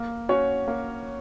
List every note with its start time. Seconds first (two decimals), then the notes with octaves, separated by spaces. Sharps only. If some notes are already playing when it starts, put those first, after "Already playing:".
Already playing: A#3
0.29 C#4 F#4 C#5
0.68 A#3